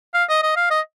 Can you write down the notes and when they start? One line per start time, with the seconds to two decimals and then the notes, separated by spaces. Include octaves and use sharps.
0.14 F5
0.29 D#5
0.43 D#5
0.56 F5
0.71 D#5